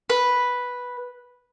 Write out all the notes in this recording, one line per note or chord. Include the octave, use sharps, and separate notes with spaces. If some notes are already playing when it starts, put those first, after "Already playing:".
B4